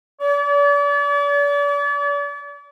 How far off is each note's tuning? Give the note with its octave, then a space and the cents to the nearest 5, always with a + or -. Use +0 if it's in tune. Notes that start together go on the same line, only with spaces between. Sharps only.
D5 -40